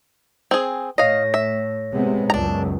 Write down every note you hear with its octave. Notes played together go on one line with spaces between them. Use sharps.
C4 G#4
A2 C#5 D#5 F5 A#6
E5
C3 G#3 B3
C#2 F#2 D4 A#5